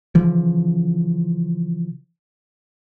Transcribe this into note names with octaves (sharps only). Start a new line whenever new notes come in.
C#3 E3 F3